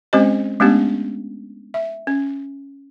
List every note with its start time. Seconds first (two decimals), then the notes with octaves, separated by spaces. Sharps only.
0.13 G#3 C4 C#4 G4 C5 D#5
0.60 G#3 A3 B3 C#4 D4 G4
1.74 E5
2.07 C#4